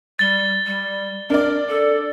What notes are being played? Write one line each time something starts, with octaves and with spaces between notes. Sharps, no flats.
G3 A6 G7
G3
D4 A#4 D5
A4